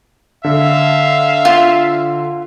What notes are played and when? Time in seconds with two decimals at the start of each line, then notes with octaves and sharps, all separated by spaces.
0.44 D3 E5 F5
1.45 F4